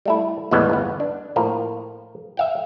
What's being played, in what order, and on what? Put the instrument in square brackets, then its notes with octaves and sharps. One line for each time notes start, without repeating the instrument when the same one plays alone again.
[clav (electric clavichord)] G3 A3 E4
D#2 A2 E3 G3 G#3 B3
G1 B3
D4
A2 F3 A#3
E5 F5 G5